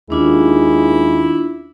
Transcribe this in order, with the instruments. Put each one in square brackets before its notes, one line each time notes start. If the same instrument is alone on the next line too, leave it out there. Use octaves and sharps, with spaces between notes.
[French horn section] D#2 [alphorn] G#3 [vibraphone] C#4 D4 F4 [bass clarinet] E4